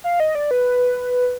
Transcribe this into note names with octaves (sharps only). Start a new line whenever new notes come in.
F5
D#5
D5
B4